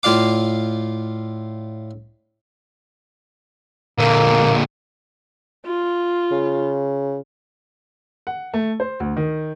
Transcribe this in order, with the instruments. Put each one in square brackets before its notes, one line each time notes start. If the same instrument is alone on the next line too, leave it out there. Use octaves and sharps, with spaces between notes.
[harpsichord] A2 F4 D5 F5 D6
[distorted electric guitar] A#2 D3 [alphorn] A#3
[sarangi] F4
[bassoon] C#3
[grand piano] F#5
A3
C5
D2
D#3